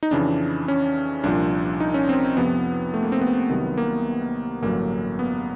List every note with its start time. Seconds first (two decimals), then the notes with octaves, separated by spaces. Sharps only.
0.03 D#4
0.11 F2 C#3 E3 D4
0.68 C#4
1.24 C2 A#2 F3 D4
1.80 D#4
1.94 C#4
2.09 C4
2.37 F2 C3 F3 B3
2.94 A3
3.03 A#3
3.12 C4
3.22 B3
3.49 C2 C3 D#3 F#3
3.78 A#3
4.62 A1 G2 D3 F#3 A#3
5.19 B3